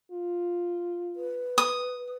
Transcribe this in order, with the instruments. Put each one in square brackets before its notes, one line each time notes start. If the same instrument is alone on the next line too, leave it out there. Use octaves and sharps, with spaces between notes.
[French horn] F4
[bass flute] B4
[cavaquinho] D#6